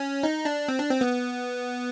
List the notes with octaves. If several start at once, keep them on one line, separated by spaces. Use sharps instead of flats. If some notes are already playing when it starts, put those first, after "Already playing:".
Already playing: C#4
D#4
D4
C4
D4
C4
B3